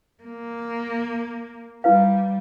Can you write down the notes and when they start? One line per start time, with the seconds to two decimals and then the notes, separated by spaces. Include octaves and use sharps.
0.23 A#3
1.84 G3 E4 B4 F5